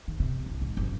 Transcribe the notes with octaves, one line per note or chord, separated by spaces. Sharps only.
D#3
C3
C2
G#2
F#1